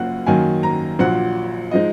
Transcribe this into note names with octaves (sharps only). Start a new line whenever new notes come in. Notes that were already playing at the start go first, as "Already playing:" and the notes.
Already playing: F#1 F#2 F3 A#3 C#4 F#5
F#2 D#3 F#3 A#3 G#5
A#5
A#1 A#2 F#3 F#5
F3 G#3 D#4 D#5